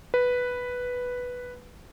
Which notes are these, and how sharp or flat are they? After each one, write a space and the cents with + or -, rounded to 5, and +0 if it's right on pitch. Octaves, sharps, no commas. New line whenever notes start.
B4 +0